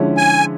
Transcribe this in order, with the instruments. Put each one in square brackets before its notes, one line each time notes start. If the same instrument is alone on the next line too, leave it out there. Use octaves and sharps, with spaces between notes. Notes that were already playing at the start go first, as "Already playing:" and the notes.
Already playing: [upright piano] D3 F3 G#3 C#4 E4
[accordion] G#5